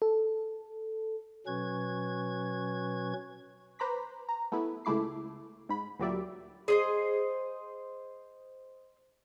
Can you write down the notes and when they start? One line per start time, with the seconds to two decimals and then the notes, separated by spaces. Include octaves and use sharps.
0.02 A4
1.47 B2 F#3 C#4 B4 C#6 G#6
3.79 B4 C5 A#5 B5 D6 B6
4.29 A#5
4.52 A3 B3 E4 B4
4.85 C#2 A3 E4 D6 C7
5.69 G#2 B5
5.99 D2 A#2 F#3 G4 D5 E5
6.68 G#4 C5 D#5